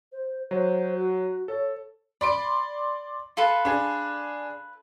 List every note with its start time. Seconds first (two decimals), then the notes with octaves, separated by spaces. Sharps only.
0.12 C5
0.51 F#3 C5
0.95 F#4
1.48 A4 C#5
2.21 D5 B5 C6 D7
3.37 F4 A4 B4
3.65 D4 G#4